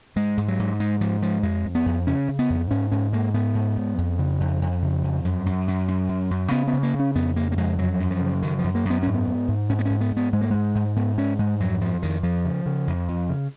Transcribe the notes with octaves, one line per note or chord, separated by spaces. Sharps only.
G#2 G#3
G#2
F#3
G#2
G#2 G#3
G#2 F3
G#2 F3
F2 G#3
F2
B3
F2
C#3 C#4
C#3
B3
F2
G#2 C#4
G#2 C#4
G#2 A#3
G#2 B3
G#2
G#2
F2
C#3
F2
F2
C#3
F2
F#2
F#2
F#2
F#2
F#2
F#2
C#3 B3
B3
C#3
A#3
C#3
C#4
F2 B3
C#3 A#3
A#3
F2 G#3
F#2 F#3
F#2
F3
C#3
F#2 D#3
F3
F#2
A#3
F#2
B3
G#2 C#4
B3
G#2
G#2
G#2 C#4
B3
C#4
G#2
B3
G#2 B3
G#2 G#3
A#3
G#2 G#3
G#2
G#2 B3
G#2 C#4
G#2 G#3
F2 F#3
F2 F3
F2 D#3
F2 F3
C#3
C#3
F2
F2
C#3